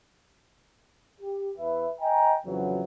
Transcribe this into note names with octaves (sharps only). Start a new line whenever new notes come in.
G4
E2 B4 E5
D#5 G5 G#5 A#5
F2 C#3 E3 F#3